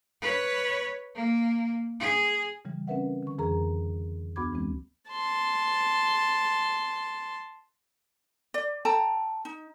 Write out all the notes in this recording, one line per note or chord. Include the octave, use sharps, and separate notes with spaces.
B4 C#5
A#3
G#4
C#3 E3 G3
C4 C#4 A#4 B4 E5 F#5
D3 C#6
F2 E3 G#4 A#4 A#5
D2 B3 F#4 B5 D6 G#6
E3 G#3 C4
A5 C6
D5
A4 G5 A5 A#5
D#4